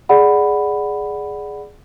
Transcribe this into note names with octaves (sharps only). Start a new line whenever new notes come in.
G#4 D5 F#5 B5